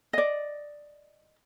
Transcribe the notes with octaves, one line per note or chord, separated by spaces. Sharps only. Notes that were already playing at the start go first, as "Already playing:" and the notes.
D5 D#5